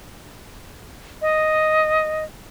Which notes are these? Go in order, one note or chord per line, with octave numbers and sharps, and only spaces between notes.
D#5